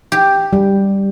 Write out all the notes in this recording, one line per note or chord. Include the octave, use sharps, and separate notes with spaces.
G4
G3